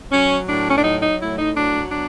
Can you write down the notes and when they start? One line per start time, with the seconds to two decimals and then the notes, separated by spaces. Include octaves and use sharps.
0.12 F#3 C#4
0.48 A2 D4
0.70 C#4
0.76 D4
0.83 F#3 D#4
1.02 D#4
1.20 A2 E4
1.38 D#4
1.56 F#3 D4
1.91 B2 D4